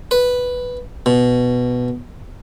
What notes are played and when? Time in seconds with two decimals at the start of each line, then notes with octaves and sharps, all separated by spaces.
0.11 B4
1.06 B2